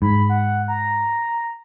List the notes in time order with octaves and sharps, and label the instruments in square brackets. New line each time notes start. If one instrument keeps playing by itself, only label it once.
[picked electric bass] G#2 [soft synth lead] B5
[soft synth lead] F#5
A#5